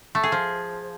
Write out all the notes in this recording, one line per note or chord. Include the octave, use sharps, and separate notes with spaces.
A3
G#4
F3